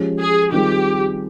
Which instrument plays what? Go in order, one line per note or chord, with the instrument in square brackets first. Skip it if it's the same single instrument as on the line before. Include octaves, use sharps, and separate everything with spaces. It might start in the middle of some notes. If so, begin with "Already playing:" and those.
Already playing: [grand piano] F3 G#3 C#4 G4
[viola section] G#4
[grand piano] D#3 G3 C4 F4 G#4 [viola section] G4